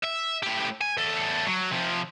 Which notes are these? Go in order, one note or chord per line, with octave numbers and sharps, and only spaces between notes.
E5
A2 G4
G#5
E2 A4
F#3
C3 F3